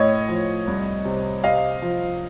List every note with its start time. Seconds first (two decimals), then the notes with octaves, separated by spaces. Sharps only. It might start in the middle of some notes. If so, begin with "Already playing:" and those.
Already playing: A2 C#5 D#5
0.29 F3
0.67 C2
1.05 C3
1.44 C3 D#5 F5
1.82 F3